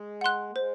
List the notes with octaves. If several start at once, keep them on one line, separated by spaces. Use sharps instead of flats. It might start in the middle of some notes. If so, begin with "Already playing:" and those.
Already playing: G#3
F#5 C6 F#6
A#3
G#3 C5